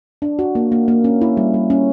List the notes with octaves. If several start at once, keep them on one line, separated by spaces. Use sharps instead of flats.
D4
F#4
A#3
A#3
A#3
C#4
E4
G3
G3
C#4